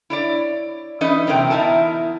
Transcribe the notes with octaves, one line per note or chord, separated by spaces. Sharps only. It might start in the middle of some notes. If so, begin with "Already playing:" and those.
E4 C#5 D5
E3 C#4 D#4 B4 D#5
E2 C3 F#3 C4 A#4 G5
E2 D#4 E4 A#4 A5